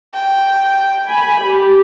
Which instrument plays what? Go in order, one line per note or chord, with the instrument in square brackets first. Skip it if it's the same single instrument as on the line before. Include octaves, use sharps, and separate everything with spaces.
[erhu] G5
[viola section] G#5 B5
G4